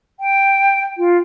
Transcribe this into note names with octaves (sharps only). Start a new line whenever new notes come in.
G5
F4